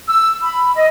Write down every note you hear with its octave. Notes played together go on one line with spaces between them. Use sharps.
E6
B5
D#5